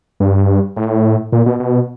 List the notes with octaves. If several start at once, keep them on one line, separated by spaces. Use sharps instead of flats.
G2
A2
A#2
B2
B2